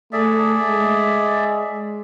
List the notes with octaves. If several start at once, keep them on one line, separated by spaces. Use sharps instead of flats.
A3 G#4 D5 E5
G#3